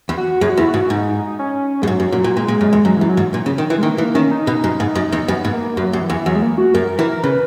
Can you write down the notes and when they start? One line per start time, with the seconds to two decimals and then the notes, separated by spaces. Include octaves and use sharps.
0.09 E2
0.17 F#4
0.41 F#2 G#4
0.50 F#4
0.58 E2 E4
0.68 F#4
0.74 G#2
0.90 G#2 D#4
1.39 C#4
1.82 F#2 G#3
1.88 G#2 F#3
2.00 F#2
2.12 A#2 F#3
2.24 A#2
2.36 A#2 G#3
2.48 A#2
2.61 F#2
2.73 E2
2.85 F#2 F#3
2.97 F#2 E3
3.09 F#3
3.17 G#2
3.34 A#2
3.46 C#3
3.58 D#3
3.70 E3
3.78 G#3
3.83 D#3 A#3
3.98 E3 A#3
4.15 D#3 C#4
4.31 D#4
4.47 B2
4.64 F#2
4.80 G#2
4.95 F#2
5.12 E2
5.28 F#2 B3
5.45 G#2
5.53 A#3
5.77 F#2 F#3
5.93 F#2 F#3
6.01 E3
6.10 E2
6.26 E2 F#3
6.36 G#3
6.42 A#3
6.58 F#4
6.74 F#2 A#4
6.99 E3
7.12 A#4
7.23 C#3 B4